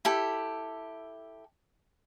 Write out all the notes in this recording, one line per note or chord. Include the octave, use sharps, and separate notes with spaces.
E4 G4 A4